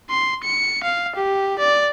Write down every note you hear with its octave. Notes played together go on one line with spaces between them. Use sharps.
C6
C#7
F5
G4
D5